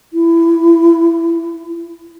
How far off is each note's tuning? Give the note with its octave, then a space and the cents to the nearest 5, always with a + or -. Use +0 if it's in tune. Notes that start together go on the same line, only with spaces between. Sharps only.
E4 +20